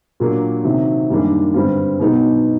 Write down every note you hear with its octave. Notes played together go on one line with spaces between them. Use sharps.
A#2 F#3 A#3 D4
C3 D#3 F#3
F#2 D#3 G3 A#3 D4
G2 D3 G3 C4
B2 F#3 B3 D#4